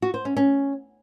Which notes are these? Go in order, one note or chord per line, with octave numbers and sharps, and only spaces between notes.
F#4
C5
C#4
C#4